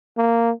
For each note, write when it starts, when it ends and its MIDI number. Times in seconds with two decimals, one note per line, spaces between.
0.18 0.51 58